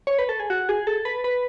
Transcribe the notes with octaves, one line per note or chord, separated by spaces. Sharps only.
C#5
B4
A4
G#4
F#4
G#4
A4
B4
B4